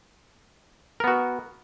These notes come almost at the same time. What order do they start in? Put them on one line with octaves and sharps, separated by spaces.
A#4 B3 F#4